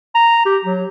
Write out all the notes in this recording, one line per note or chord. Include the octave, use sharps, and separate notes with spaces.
A#5
G4
F#3